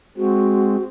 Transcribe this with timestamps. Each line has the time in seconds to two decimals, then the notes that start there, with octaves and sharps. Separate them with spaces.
0.17 G#3 C4 F#4